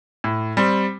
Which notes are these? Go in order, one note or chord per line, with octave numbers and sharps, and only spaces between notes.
A2
G3 C4